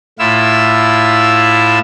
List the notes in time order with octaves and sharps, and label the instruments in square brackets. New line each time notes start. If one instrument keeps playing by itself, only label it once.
[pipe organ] A2 E4 F4 E6